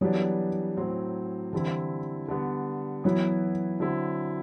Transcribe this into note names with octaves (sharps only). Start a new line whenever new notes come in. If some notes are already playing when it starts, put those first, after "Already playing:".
E3 F#3 G3 B3 D4
A2 F#3 C4
D3 E3 G3 C4 E4
D3 G3 B3
E3 F#3 B3 E4
D3 F#3 C4 E4